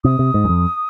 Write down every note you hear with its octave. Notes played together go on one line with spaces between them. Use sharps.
C3 D#6
C3
G#2
F#2
F2